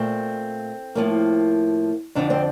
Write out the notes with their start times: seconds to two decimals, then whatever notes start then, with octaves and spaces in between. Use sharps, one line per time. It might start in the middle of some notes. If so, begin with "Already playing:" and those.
Already playing: A#2 A3 C4
0.95 A2 F3 A#3
2.15 F2 D3 F3 D4
2.30 C4